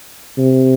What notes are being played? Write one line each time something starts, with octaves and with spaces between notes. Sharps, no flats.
C3